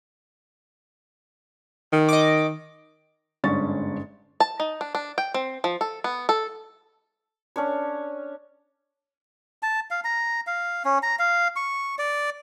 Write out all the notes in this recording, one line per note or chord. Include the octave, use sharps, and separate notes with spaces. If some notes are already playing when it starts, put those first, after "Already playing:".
D#3
D#5 D6
G1 G#2 C#4 D4 C#6 A6
A5
D#4
D4
D4
G5
C4
F3
A4
B3
A4
C#4 D4 C#5
A5
F5
A#5
F5
C#4
A#5
F5
C#6
D5